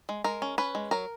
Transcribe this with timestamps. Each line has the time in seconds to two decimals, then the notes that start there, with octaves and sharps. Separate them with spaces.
0.09 G#3
0.24 G#3 A#4
0.42 C#4
0.58 C#4 B4
0.75 G#3
0.91 F#3 A#4